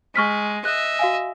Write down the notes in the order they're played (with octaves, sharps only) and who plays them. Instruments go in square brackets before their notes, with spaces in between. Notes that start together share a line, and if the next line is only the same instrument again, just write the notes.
[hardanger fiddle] G#3 [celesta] C#6 F6 B6
[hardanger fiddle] D#5 E5 [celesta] F#6
[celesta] F#4 F5 G#5